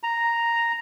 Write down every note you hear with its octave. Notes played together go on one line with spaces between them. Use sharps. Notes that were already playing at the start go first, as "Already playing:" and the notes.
A#5